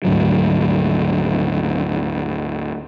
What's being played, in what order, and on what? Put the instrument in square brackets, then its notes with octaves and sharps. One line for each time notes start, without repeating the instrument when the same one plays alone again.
[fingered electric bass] D2 G#2 F#3